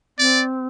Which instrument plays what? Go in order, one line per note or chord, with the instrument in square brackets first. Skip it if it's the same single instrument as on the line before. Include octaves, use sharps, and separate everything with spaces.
[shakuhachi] C4 [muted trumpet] D5